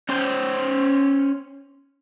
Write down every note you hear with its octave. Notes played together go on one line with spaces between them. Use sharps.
C#4 C5